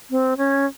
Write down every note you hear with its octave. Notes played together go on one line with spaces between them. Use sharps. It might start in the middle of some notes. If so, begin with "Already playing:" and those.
C4
C#4